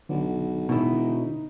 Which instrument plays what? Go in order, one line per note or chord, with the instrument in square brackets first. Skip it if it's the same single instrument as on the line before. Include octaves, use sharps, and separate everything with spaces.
[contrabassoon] B1 [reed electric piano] D3
[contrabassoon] E1 [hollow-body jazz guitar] B2 E4 [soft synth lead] D#4